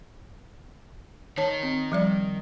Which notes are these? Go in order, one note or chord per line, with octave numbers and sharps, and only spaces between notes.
D#3 C#5 A5
C4
F3 G3 D5